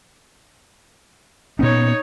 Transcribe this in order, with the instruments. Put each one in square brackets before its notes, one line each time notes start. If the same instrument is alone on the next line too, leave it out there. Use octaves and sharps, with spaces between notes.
[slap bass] A#2 B3 C#4 [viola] D#4 C#5